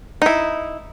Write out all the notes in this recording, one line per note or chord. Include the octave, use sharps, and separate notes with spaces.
D#4 E4